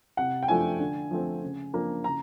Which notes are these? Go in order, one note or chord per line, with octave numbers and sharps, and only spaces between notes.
C3 F#5
G5
F3 A3 D4 G#5
D3
F3 A3 C4
C#3
F3 A#3 D4
C#3 A#5